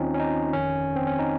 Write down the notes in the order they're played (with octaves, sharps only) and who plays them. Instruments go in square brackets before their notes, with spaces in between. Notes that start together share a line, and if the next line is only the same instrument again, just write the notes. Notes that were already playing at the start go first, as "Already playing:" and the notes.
Already playing: [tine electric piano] D#2 D#3 C4 C#4 D#4 F4
C#4
D#4
G1 F2 D#3 C#4
C4
C#4
D#4